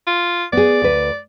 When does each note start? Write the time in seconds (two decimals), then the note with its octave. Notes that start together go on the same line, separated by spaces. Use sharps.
0.07 F4
0.53 B3 G#4 D5
0.82 D2 B4